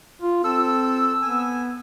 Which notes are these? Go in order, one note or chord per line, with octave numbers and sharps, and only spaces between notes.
F4
C4 A4 E6
B3 G#5